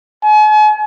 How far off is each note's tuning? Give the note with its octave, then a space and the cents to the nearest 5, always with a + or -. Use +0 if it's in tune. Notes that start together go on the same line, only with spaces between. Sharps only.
G#5 +45